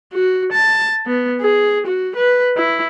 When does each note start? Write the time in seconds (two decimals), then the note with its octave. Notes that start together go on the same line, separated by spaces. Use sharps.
0.13 F#4
0.52 A5
1.06 B3
1.41 G#4
1.86 F#4
2.16 B4
2.57 E4